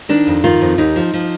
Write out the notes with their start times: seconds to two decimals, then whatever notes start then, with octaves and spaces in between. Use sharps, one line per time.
0.09 D#3 D4
0.27 F2
0.44 D#3 F4
0.61 F2
0.78 D#2 D#4
0.96 F3
1.14 F3